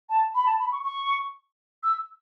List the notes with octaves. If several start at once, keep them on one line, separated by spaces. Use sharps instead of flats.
A5
B5
A5
B5
C#6
C#6
E6